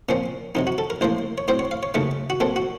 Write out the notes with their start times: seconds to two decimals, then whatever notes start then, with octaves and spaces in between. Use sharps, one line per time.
0.09 A#2 F3 C4 C#4
0.55 F2 C3 F#3 D#4
0.67 F#4
0.78 A4
0.90 A#4
1.01 A1 A2 F3 A#3 C5
1.38 C#5
1.48 A2 F#3 C4 C5
1.59 C#5
1.71 F5
1.83 C#5
1.94 D#2 C#3 F#3 A3 C#4
2.30 F#4
2.40 A#2 F#3 C4 A4
2.56 F#4